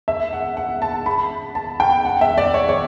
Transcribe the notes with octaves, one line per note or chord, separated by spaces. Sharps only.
E5
F#5
F#5
A5
B5
A5
G5
F#5
E5
D5
C#5
C#5